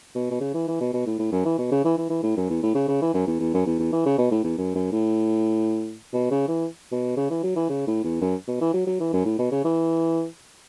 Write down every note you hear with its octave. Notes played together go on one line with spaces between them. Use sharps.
B2
B2
C#3
E3
E3
B2
B2
A2
A2
F#2
E3
B2
C#3
E3
E3
E3
A2
F#2
E2
A2
C#3
C#3
E3
F#2
E2
E2
F#2
E2
E2
E3
C#3
B2
A2
E2
F#2
F#2
A2
B2
C#3
E3
B2
C#3
E3
F#3
E3
C#3
A2
E2
F#2
B2
E3
F#3
F#3
E3
F#2
A2
B2
C#3
E3